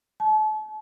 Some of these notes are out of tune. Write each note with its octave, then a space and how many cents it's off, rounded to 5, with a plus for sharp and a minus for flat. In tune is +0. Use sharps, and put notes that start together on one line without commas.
A5 -35